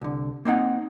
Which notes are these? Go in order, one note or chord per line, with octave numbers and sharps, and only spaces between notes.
C2 D3
A#3 C4 D#4 F#5